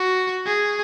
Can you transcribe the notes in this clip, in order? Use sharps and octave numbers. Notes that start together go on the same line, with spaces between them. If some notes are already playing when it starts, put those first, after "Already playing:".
Already playing: F#4
G#4